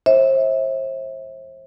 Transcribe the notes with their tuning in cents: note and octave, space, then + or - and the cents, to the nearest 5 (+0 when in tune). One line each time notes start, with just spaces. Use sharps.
C5 +35 E5 -25